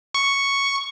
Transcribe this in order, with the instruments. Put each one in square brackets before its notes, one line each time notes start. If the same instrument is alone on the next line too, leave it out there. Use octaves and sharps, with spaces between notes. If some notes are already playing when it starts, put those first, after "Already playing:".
[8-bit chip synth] C#6